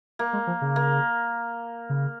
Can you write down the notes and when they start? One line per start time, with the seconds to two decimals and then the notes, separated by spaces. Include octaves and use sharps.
0.19 A#3
0.33 G#3
0.47 F3
0.61 C#3
0.76 A#3
1.89 C#3